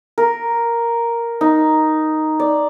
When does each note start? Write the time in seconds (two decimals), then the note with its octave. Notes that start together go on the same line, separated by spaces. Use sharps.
0.18 A#4
1.41 D#4
2.40 D5